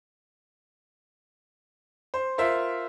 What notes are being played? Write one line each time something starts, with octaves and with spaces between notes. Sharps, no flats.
C5
F4 A#4 C5 E5